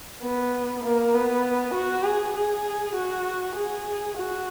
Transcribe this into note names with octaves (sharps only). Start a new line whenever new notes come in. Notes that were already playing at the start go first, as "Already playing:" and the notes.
B3
A#3
B3
F#4
G#4
G#4
F#4
G#4
F#4